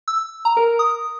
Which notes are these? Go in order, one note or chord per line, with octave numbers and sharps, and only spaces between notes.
E6
A#5
A#4
D#6